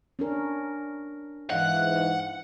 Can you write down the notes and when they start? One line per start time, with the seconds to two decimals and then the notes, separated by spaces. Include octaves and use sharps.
0.19 C#4 D4 A#4
1.50 G#2 E3 D#5 F5 F#5